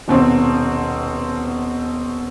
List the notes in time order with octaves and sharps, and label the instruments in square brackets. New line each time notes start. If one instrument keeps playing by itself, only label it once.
[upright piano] D#1 B2 C4